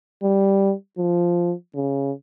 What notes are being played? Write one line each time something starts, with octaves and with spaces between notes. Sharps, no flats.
G3
F3
C#3